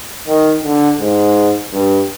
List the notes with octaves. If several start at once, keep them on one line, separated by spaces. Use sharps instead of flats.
D#3
D3
G#2
G2